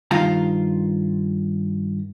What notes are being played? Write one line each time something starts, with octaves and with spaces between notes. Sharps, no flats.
G2 D#3 F4 A#5